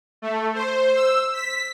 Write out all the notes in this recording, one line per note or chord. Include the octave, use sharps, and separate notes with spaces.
A3
C5
E6
B6